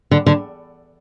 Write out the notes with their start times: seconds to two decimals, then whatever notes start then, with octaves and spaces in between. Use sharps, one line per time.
0.11 D3
0.26 D3